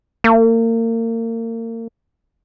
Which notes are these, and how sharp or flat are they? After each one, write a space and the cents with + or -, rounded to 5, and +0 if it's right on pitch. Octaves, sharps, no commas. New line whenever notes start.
A#3 -35